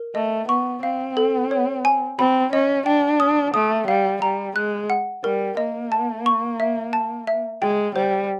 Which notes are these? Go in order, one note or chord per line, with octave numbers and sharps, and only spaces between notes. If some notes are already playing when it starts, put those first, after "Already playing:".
Already playing: A#4
A3 D#5
B3 C#6
C4 F5
A4
C#5
G#5
C4 B5
C#4 D#5
D4 G5
D#6
A3 D#6
G3 F5
G3 A#5
G#3 F#6
F#5
G3 A#4
A#3 D#5
A5
C#6
E5
A5
E5
G#3 G5
G3 C5